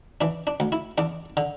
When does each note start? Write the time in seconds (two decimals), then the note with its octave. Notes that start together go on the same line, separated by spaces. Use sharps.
0.21 E3 D4
0.47 D4
0.60 D2
0.72 E4
0.98 E2 D4
1.37 D3